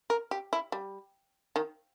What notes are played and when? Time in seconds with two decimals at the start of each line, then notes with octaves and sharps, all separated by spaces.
0.10 A#4
0.31 G4
0.53 E4
0.72 G3
1.56 D#3